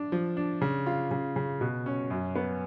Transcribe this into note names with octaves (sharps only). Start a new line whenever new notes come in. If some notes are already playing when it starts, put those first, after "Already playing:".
Already playing: D4
F3
D4
C#3
F4
C#3
C#3
B2
C#4
F#2
B3